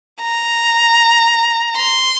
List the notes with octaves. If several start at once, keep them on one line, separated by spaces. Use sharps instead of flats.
A#5
C6